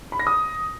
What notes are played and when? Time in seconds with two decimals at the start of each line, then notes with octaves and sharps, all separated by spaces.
0.12 B5
0.19 A#6
0.27 D#6